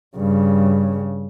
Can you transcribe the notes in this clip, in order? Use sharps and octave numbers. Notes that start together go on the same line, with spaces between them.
G2 C#3